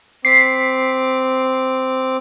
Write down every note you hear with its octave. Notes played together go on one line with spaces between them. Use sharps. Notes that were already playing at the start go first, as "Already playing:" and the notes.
C4 D6 B6 C7